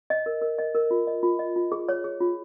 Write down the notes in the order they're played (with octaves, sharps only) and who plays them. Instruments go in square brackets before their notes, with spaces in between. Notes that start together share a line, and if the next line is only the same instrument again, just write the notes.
[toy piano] D#5
A#4
A#4
D#5
A#4
F4
D#5
F4
D#5
F4
G#4
C#5
G#4
F4